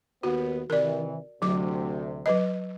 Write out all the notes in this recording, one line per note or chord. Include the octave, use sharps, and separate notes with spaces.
D#2 B3 F#4
C3 D#3 E3 A#4 D5
D2 C3 F#3 D6
F#3 B4 D#5